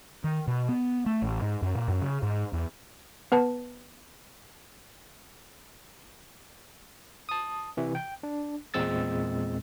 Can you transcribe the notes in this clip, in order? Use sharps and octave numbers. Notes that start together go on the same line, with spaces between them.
D#3
B2
B3
A3
A1
G#2
F#2
A#2
F#2
C#3
G#2
E2
B3 B4 A5
A5 D#6
C3 E3
G5
D4
E2 A#2 G#3 C4 E6 A6